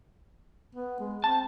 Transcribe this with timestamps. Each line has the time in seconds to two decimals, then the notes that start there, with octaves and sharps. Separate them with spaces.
0.75 B3
1.00 G#3
1.24 C4 A5